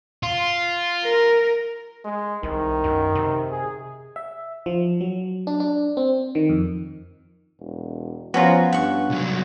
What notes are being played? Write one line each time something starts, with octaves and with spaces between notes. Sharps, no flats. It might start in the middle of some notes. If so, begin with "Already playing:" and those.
F4
A#4
G#3
C2 D#3
F#2
C3
G#4
E5
F3
F#3
D4
D4
C4
D#3
F2
E1
F3 B3 C#4 F4 F#4 A#5
G2 F#5 C#6
C2 F#3